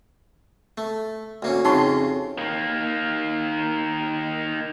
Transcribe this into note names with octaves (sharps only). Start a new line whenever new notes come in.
A3
D2 A#3 C#4
F2 C#3 D#4 F#4 C6 C#6
D#3 A#3